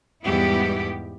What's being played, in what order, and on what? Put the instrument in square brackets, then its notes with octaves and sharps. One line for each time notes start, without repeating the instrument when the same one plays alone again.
[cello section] E2 G#2 G3 B3 E4 G4